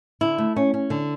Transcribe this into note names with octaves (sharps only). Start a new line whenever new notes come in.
D3 E4
A3
C#4
C#4
D3